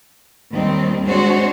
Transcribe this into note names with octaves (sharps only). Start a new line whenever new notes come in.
D#2 D#3 G3 C4
G#3 C4 D4 F#4 C5 C#5